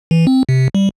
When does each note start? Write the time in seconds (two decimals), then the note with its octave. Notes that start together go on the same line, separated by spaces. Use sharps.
0.11 E3
0.27 C4
0.49 C3
0.75 G3